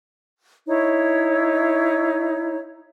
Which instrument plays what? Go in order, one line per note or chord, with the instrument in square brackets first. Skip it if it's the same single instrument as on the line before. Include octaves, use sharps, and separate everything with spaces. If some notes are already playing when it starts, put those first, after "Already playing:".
[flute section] D#4 E4 C#5